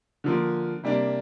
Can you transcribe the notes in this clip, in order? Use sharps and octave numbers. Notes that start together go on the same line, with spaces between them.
D3 F3 A#3
C3 G3 A#3 D4